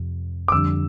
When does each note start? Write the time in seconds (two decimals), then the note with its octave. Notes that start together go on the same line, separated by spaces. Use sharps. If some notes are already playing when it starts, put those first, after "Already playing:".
Already playing: F2 C3
0.48 D6
0.52 F2 D3 G3 E6